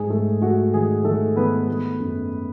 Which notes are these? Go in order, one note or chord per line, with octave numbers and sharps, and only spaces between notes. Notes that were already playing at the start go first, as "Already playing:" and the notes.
Already playing: G#2 G#4
A3
A3 F#4
D#3 G#4
D#3 A3 A4
D#3 B3 B4
A3
F#2